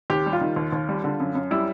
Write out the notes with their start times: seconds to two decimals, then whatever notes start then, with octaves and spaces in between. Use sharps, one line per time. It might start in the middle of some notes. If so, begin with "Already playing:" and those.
0.10 D#2 G4
0.26 G3
0.33 F4
0.41 D#3
0.56 D#2
0.72 D#2
0.88 G3
1.04 D3
1.20 F#2
1.35 F#2
1.51 G3 E4